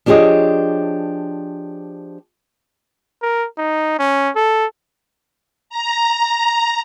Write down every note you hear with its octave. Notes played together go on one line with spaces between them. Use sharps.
F3 D4 G4 G#4 C#5 D#5
A#4
D#4
C#4
A4
A#5